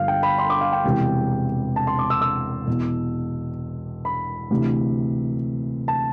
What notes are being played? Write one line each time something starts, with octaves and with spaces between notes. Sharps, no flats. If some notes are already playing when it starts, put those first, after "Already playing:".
Already playing: G1 G2 D3 F3 F5
G5
B5
C6
D6
F5
G5
E1 E2 C3 E3
A5
C6
D6
E6
E6
E2 B2
B5
D2 C3 E3
A5